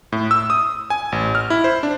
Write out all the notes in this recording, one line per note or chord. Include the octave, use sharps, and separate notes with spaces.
A2
E6
D#6
G#5
A1
F6
E4
C5
D4